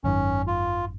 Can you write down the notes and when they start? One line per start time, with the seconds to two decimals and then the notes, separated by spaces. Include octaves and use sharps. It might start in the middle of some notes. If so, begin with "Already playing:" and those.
0.04 G#1 F#2 D#3 C#4
0.47 F4